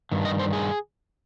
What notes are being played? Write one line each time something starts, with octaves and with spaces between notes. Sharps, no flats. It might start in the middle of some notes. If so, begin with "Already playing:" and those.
G2 D#3
D#5
C5
G#4